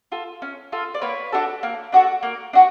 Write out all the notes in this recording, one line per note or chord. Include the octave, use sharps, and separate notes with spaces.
F4 A4
C#4
F4 A4
D5
A#3 B4 C#5
D4 F#4 A4
A#3
D4 F#4 A4
A#3
D4 F#4